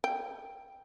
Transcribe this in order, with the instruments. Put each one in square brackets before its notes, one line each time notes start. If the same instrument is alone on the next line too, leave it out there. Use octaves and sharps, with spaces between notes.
[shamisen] G5